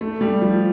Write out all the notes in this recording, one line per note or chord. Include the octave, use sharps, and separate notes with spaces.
A3
G3
F3